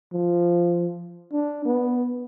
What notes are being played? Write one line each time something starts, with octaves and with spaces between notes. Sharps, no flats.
F3
D4
B3